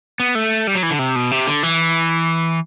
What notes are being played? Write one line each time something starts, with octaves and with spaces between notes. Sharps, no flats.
B3
A3
G3
F#3
E3
D3
C3
B2
C3
D3
E3